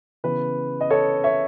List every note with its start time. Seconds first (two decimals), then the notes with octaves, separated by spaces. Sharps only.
0.24 C#3 E3 B3 B4
0.81 D#5
0.90 A4 C#5
1.24 C#5 E5